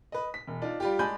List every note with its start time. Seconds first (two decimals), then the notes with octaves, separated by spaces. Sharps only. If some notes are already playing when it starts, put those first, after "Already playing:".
0.12 B4 D#5
0.34 B6
0.47 E1
0.62 D4 D#4 F4
0.80 G3 F4 G4
0.99 G#3 D4 D#5 G#5 B5 G6